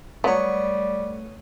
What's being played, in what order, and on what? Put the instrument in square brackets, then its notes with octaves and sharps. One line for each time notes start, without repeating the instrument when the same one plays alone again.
[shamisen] F#3 [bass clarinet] G3 [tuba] A3 [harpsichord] B3 C#5